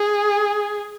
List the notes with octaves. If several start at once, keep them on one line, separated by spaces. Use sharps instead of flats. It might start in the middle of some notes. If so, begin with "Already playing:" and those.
Already playing: G#4